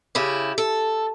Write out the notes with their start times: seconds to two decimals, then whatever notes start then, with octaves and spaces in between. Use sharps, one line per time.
0.15 C#3 E4 G4
0.58 A4